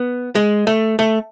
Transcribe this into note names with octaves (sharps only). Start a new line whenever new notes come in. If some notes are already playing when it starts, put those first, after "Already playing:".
Already playing: B3
G#3
A3
A3